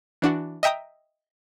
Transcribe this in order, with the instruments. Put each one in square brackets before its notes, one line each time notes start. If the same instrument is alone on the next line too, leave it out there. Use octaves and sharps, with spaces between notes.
[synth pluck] E3 D4 F#4
D#5 E5 G5 A#5 D#6